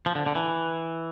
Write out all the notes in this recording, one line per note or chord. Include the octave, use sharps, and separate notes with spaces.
F3
D3
D3
E3